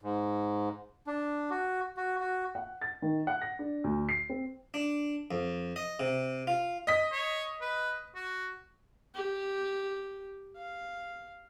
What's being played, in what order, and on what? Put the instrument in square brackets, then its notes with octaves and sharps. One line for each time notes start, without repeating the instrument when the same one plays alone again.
[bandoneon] G#2
D4
F#4
F#4
F#4
[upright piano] F#5
A6
D#3
F#5
A#6
D4
D2
C7
C4
[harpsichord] D4
F2
D#5
C3
F4
[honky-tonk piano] D#5 B6
[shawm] C#5
B4
F#4
[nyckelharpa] G4
F5